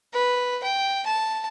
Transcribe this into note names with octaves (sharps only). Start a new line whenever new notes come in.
B4
G5
A5